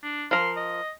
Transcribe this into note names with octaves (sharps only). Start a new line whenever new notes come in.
D4
F3 A#4 C6
D#5